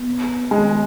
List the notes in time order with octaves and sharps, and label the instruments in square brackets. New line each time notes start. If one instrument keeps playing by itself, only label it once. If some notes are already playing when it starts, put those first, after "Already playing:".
Already playing: [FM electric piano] B3
[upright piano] G#3